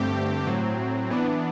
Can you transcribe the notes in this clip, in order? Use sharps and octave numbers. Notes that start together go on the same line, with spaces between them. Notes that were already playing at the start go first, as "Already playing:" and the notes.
Already playing: G2 D3 A3 C4 G4
A2 F#3 C4
E3 B3 D4